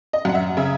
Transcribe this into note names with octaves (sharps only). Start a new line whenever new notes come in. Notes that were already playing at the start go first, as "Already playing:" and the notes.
D#5
F#2 F#5
E5
C#3 E5